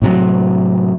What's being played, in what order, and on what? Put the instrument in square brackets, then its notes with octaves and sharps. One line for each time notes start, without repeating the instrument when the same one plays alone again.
[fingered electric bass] A2 C3 F#3